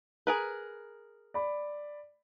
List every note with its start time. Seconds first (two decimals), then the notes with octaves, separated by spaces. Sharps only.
0.27 G#4 A#4 B4
1.34 D5 B5